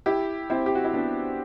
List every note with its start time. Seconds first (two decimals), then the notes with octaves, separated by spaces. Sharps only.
0.06 E4 G4
0.50 C4 E4
0.66 G4
0.75 F#4
0.84 E4
0.94 B3 D4